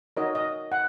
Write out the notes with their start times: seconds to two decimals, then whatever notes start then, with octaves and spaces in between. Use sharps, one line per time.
0.17 D#4 F#4 A#4 C#5 D#5
0.35 D#5
0.72 F#5